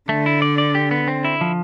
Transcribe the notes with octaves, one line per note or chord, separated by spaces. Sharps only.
D3 A3
E4
D5
D5
G4
B3
C4
E4
F3